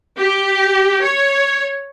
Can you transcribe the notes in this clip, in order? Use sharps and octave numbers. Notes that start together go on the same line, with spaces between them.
G4
C#5